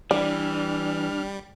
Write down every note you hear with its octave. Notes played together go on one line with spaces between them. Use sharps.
E3 G3 D4 D5 F6